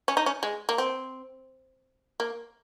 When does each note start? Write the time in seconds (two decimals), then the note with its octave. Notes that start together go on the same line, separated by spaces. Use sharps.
0.08 C#4
0.17 D#4
0.26 C#4
0.43 G#3
0.69 A#3
0.78 C4
2.20 A#3